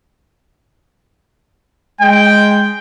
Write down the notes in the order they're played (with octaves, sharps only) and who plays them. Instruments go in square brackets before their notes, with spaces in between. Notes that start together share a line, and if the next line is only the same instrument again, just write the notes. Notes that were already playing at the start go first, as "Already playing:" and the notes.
[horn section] G#3 [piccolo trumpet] G5